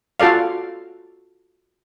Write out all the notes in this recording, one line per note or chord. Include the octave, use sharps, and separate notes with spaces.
F4 F#4 A4 D5 F5